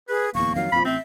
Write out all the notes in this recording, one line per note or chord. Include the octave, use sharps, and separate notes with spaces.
G#4 B4
D1 E2 A#3 C#6
F2 D#3 F#3 F5
F2 A#2 F3 B5
A1 C4 E5